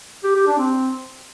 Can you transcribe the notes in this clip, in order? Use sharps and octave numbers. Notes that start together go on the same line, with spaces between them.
G4
G4
D4
C4